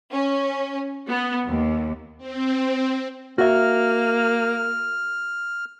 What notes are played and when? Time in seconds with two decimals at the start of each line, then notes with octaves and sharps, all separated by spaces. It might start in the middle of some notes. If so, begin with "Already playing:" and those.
0.13 C#4
1.08 B3
1.47 D#2
2.18 C4
3.38 A#3 F#4 E5 F6